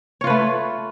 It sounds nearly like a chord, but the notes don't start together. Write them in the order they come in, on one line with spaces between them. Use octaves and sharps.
C#5 F4 B4 A3